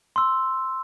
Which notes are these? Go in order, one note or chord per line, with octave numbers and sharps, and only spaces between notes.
C6 E6